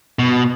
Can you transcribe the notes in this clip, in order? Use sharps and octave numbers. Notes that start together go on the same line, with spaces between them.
B2